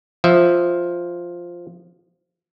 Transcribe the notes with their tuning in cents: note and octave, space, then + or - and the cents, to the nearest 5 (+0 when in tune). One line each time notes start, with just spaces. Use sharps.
F3 +0 E5 +0